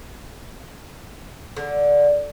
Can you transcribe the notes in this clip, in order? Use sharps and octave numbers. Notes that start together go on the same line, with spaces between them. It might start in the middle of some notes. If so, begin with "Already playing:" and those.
D3